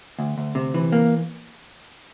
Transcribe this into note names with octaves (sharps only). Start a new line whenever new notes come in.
D2
D2
C3
E3
A#3